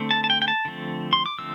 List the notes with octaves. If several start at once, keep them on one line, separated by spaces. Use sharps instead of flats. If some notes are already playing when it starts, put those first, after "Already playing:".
Already playing: D3 A3 C4
A5
A5
G5
G5
A5
D3 F3 A3 C4
C6
D6
D3 F3 A3 C4 E6